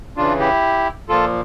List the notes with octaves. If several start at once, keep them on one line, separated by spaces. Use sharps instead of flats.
C#3 E3 D4 F4
E4 G4
A#2 F3 F4 A4